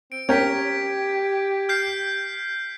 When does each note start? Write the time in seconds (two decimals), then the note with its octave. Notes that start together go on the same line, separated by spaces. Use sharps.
0.12 C4 D7
0.29 C#4 G4 A#4 G5 G#6 B6
1.69 F6 G6 C7